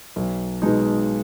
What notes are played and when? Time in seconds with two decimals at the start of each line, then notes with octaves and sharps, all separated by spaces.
0.16 B1
0.62 B2 G#3 D#4